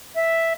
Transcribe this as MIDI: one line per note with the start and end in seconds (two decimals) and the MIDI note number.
0.16 0.53 76